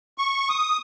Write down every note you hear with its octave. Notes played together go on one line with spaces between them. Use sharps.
C#6
D#6